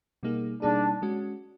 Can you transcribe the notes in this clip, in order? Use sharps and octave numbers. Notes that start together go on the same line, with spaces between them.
B2 G3 A#3 D#4 G#4
B2 G3 A#3 D4 D#4 G#4
G#3 C#4 F#4